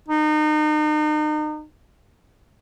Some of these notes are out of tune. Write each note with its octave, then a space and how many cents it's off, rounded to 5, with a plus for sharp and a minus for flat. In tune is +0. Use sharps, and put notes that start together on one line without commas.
D#4 -35